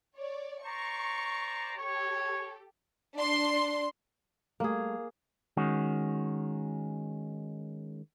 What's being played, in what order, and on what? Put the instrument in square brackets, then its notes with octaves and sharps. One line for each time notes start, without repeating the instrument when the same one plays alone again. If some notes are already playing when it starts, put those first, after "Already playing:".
[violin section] C#5 D5
[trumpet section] C5 D5 A#5 [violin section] C#6 C#7
[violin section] G4 A4 [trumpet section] C#5
[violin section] D4 C6
[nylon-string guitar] G3 A3 [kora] A#3 G#4
[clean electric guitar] D#3 G#3 C#4 F#4